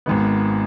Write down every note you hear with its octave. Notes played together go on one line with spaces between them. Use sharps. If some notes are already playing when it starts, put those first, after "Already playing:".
G#1 G#2 D#3 B3